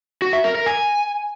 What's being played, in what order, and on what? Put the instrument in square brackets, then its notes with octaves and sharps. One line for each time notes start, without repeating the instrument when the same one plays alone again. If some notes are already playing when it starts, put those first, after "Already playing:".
[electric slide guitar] F#4
E5
A#4
A#4
G#5